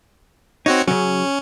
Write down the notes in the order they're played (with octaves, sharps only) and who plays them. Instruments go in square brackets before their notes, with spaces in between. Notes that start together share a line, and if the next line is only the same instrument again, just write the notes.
[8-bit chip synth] C4 F#4 C#5 [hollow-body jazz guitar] D#4
[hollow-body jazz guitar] C#3 F#3 [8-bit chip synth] C#4